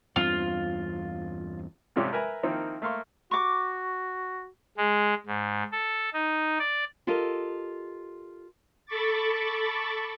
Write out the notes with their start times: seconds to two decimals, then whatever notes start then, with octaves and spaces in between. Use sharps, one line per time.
0.16 E2 G2 C4 F4
1.96 F2 G#2 C3 G3 C#4 G4
2.13 A#4 B4 E5 G#5 A#5
2.43 D#3 F3 A#3 C4 D#4 E4
2.82 A3 A#3 F5 C6 C#6
3.31 F#4 C#6 D6
4.78 G#3
5.27 G#2
5.72 A4
6.13 D#4
6.59 D5
7.07 F4 G4 A4 A#4 D#5
8.86 A4 B5 C#6 D6 A6